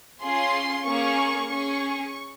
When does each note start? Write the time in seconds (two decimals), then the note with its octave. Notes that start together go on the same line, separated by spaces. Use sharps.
0.22 C#4 F4 G#4 C6
0.86 A#3 C#4 G#4 C#6
1.50 C#4 G#4 C#6